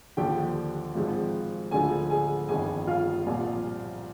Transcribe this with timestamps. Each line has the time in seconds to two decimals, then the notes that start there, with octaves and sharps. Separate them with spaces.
0.17 D#2 D3 F3 G4 G5
0.95 G#1 G#2 F3
1.71 D2 D3 F3 G#4 G#5
2.10 G#4 G#5
2.48 G1 F2 D#3 G#4 G#5
2.87 F4 F5
3.26 C2 A#2 F3